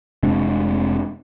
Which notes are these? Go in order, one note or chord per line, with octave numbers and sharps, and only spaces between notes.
F1 C3 G#3 D4